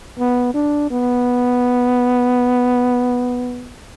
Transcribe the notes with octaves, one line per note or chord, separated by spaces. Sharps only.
B3
D4
B3